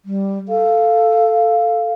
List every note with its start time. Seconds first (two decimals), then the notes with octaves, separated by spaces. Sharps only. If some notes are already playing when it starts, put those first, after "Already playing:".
0.05 G3
0.48 A4 F5